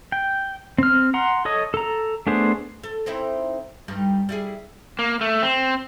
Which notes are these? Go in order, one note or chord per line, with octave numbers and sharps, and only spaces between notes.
G5
C4 F6
F#5 A#5 C6
A4 C#5 D#5 D#6
A4 A#5
A3 B3 D4 G#4 C5
A4
C4 D#4 E4
G2 G3 D#4
G3 E4 G#4
A#3
A3
C4